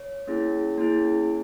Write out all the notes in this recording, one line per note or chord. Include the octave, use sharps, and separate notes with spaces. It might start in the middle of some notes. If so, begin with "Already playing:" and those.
Already playing: C#5
A#3 C#4 E4 G#4
A#3 C#4 E4 G#4